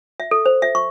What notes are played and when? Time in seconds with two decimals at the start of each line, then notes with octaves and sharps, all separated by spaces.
0.20 E5
0.31 A4
0.46 C5
0.62 E5
0.75 C#6